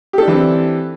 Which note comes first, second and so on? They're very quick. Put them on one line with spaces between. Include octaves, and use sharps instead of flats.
G4 A4 D4 E3 C4